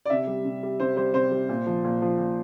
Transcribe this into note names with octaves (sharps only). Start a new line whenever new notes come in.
D5
C3 E5
G3
C3
G3
C3 C5
G3 C5
C3 C5
G3
A#2
F3
A#2
F3
A#2